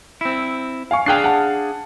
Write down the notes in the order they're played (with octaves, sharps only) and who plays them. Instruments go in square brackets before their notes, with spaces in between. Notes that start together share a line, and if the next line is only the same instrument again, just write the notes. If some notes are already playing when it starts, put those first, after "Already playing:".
[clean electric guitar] C4 E4
[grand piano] F5 G#5 C#6
[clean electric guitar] D4 G#4 F5 [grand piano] G5 F#6 C7
[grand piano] F#5 A5